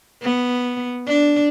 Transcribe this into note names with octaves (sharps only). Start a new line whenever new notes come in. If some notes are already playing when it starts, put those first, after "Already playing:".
B3
D4